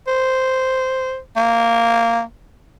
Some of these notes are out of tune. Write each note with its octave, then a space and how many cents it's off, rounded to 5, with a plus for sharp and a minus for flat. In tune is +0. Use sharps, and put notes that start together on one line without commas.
C5 -5
A#3 -10